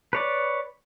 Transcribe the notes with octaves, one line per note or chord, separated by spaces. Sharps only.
B4 C#5 D5